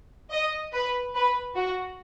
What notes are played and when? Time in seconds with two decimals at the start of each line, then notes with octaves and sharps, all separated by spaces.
0.31 D#5
0.73 B4
1.14 B4
1.55 F#4